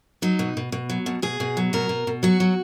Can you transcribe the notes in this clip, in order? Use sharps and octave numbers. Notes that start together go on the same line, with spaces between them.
F#3 D#4
B2
B2
B2
F#3
B2
B2 G#4
B2
F#3
B2 A#4
B2
B2
F#3 F#4
F#3